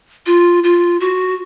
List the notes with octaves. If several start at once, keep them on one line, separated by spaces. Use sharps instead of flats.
F4
F4
F#4